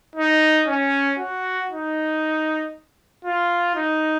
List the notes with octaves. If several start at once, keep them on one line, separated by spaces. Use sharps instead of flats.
D#4
C#4
F#4
D#4
F4
D#4